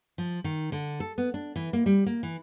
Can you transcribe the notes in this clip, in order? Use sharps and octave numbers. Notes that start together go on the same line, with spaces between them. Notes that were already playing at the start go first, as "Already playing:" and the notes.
F3
D#3
D3
A4
B3
D4
E3
A#3
G3
A#3
E3